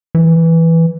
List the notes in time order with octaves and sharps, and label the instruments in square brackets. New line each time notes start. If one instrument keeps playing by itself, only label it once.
[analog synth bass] E3